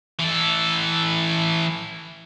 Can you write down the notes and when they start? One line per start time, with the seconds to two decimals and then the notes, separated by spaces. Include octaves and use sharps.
0.20 E3 A4